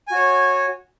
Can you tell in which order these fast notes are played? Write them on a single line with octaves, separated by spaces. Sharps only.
G#5 F#4 C#5